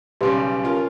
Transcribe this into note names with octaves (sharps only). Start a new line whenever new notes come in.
B1 C#3 G3 G4 B4 C6
C#4 F4 A#4